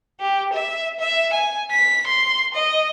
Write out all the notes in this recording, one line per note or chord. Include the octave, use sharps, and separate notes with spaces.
G4
E5
E5
G#5
B6
C6
D#5